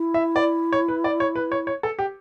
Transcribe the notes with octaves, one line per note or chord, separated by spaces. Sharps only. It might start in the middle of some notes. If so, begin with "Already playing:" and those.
Already playing: E4
E5
D5
C#5
B4
D5
C#5
B4
C#5
C#5
A4
G4